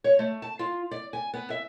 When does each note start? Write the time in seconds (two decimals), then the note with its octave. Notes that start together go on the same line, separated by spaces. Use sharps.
0.04 C#5
0.19 A3
0.42 A5
0.59 F4
0.91 D5
1.13 G#5
1.34 B3
1.50 E5